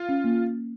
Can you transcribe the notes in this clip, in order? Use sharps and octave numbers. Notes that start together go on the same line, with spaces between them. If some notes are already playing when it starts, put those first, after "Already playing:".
Already playing: F4
C#4
A#3